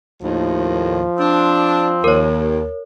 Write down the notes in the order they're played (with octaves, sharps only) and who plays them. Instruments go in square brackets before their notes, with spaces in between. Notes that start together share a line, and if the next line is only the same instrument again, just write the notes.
[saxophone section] D#2 A2 [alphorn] F3
[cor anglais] C4 [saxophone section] D4
[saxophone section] D#2 [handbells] A#4 C#5